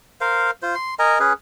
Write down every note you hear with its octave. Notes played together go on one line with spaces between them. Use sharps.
A#4 C5 F5
F4 C5
C6
A#4 D#5 G#5 A#5
C#4 G#4 B4